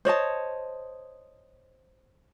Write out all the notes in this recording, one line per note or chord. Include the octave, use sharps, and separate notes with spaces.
C5 C#5 D#5 A5